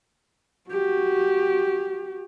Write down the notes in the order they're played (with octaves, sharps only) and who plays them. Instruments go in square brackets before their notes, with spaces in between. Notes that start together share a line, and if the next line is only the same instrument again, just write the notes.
[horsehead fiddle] F#4 G4